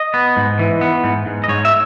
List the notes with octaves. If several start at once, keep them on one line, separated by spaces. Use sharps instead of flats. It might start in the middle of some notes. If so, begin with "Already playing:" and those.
Already playing: D#5
B3
G#2
E3
B3
G#2
G#2
D#5
G#2 C#5
E5